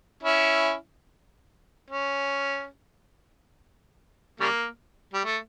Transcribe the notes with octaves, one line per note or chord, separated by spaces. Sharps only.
C#4 E4
C#4
C#3 G3 A#3
G3
A3